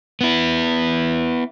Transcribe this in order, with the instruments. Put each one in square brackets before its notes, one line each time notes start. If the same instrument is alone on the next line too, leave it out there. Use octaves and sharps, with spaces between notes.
[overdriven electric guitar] B3 E4